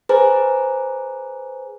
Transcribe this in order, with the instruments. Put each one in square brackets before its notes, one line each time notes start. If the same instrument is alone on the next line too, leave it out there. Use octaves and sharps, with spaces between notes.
[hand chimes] G#4 B4 C5 G#5 A#5